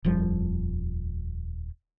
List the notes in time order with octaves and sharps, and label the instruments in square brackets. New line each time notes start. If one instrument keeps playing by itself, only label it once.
[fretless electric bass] D#1 F2 F3 G3